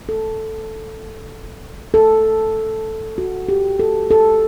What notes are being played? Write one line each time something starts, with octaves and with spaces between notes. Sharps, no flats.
A4
A4
F#4
G4
A4
A4